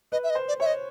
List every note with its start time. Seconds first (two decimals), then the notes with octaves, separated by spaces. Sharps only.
0.12 B4 D#5
0.23 E5
0.30 D#5
0.35 C5
0.48 D5
0.60 C#5 E5
0.66 D#5